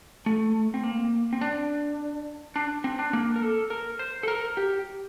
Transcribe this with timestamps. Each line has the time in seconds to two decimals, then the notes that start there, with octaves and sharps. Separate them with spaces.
0.26 A3
0.74 C4
0.83 A#3
1.33 C4
1.41 D4
2.56 D4
2.84 C4
2.99 D4
3.13 A#3
3.36 A#4
3.42 A4
3.70 A#4
3.99 C5
4.23 A4
4.28 A#4
4.57 G4